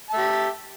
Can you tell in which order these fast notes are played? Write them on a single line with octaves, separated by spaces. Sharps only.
A5 E5 G4